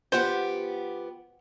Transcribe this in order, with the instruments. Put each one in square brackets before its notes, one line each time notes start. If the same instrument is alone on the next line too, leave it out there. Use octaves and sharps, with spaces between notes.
[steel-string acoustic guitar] F3 B3 G4 [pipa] C5 F#5